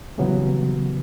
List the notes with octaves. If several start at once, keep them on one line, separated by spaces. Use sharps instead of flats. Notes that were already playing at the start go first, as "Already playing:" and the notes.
A#2 C#3 E3 F#3 G3 B3